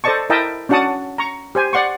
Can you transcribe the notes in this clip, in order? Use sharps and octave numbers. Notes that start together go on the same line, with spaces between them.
A4 C5 D5 D#5 A5 C#6
E4 A#4 D#5 E5 G5 A5
C#4 D4 F#4 F#5 A5 D#6
A#5 C#6
G4 C5 G#5
D5 F#5 C6 C#6